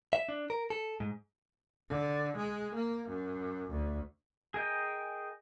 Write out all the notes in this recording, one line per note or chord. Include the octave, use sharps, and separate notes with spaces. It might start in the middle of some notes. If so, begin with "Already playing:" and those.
E5
D4
A#4
A4
G#2
D3
G#3
A#3
F#2
D2
G#4 A#4 D#5 G5